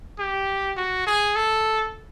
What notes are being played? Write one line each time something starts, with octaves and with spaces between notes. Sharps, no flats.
G4
F#4
G#4
A4